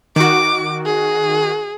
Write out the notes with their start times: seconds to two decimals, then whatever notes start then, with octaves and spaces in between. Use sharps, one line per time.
0.16 D#3 F#4 D6
0.86 G#4